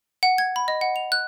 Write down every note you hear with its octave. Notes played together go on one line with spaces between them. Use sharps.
F#5
G#6
B5
D#5
F#5
F7
F#6